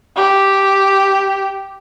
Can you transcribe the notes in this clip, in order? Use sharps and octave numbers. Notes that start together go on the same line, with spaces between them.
G4